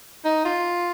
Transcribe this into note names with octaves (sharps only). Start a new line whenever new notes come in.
D#4
F4